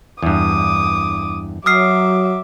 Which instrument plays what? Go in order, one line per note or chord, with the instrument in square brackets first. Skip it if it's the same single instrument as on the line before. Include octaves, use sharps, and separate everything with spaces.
[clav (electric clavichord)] E2 G2 [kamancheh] D6 D#6
[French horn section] F#3 [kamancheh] E5 D6 [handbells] D#6 F6 C7